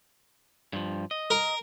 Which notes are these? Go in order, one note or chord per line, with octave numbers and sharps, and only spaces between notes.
G2 F3
D#5
A#4